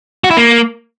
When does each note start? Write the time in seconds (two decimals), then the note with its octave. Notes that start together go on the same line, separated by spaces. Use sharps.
0.24 F#4
0.31 E4
0.37 A#3